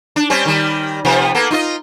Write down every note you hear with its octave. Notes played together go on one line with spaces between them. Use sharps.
D4
G3 C4 C#4
D#3 G3
C3 F3 B3
A#3 B3 A4
D#4 F4 D#5